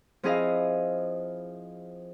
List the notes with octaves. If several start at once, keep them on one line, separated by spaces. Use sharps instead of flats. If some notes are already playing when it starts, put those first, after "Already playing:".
F3 C4 E4 G#4 D#5 F5